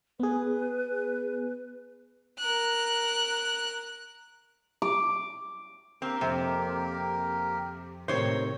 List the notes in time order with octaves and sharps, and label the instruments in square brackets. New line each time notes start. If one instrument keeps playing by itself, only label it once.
[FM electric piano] B3 G#4 [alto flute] B4
[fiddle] A#4 F#6
[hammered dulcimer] D6
[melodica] A#3 G4 A#4 [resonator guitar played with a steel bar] C4
[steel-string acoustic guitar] F2 [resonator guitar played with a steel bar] C3
[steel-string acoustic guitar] A2 C3 D#3 [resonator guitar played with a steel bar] C5 C#5